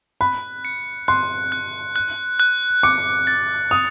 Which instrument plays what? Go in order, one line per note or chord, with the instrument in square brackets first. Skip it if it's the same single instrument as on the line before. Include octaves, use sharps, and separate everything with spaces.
[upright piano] B5 [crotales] F#6
[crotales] C#7
[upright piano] C6 [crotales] F#6
[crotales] F#6
F#6
F#6
[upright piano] D6 [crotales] C#7
[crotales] A6
[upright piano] D#6 [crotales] F7